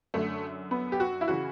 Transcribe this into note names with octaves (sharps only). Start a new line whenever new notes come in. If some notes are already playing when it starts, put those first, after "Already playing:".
F#2 D3 A3
B3
G4
F#4
E4
C#3 E3 F#4